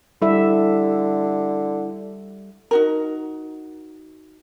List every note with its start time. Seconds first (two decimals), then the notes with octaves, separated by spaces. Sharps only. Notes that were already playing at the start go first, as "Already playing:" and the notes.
0.22 D3 G3 E4 A4 E5
2.71 D#4 F#4 A#4